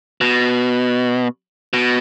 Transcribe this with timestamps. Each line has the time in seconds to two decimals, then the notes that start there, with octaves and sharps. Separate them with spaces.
0.21 B2
1.73 B2